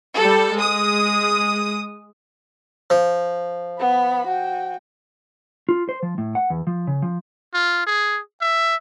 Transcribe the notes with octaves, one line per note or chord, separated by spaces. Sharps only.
G3 A4
G#3 D#6
F3
B3 B5
F#4 G5
F4
C5
F3
A2
F#5
E2
F3
C#3
F3
F4
G#4
E5